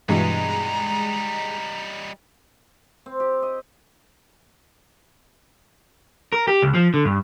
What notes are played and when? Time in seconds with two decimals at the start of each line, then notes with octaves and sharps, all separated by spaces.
0.09 G2 B2 E3 G3 G#3 D#4 A#5
3.06 C4
3.20 G4
3.42 D#5
6.33 A#4
6.48 G4
6.62 C#2
6.75 F3
6.94 D3
7.05 G2